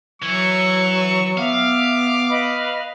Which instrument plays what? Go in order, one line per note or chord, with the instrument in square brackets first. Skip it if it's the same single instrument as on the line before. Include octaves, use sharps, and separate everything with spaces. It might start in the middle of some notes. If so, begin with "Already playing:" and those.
[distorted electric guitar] E3 [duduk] F#3 [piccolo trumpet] C#6
[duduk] B3 [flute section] E5 [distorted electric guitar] F5 [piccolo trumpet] D6
[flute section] B4 D#5 B5